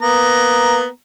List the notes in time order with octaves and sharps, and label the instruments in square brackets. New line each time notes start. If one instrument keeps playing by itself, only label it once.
[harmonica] A#3 B3 A#5